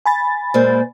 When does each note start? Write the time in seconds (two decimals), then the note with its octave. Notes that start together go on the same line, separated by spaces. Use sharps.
0.06 G#5 B5 A6
0.54 A#2 G#3 A#3 C5